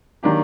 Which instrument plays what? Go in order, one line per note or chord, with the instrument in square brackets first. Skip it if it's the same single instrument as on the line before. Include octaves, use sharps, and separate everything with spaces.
[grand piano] D#3 F#3 A#3 D4 G4